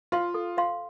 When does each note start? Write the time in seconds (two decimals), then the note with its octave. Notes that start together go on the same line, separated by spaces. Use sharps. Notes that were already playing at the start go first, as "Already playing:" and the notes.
0.12 F4 C5 F5 C6
0.34 A4
0.57 C5 F5 C6